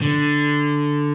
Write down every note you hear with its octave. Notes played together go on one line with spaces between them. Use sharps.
D3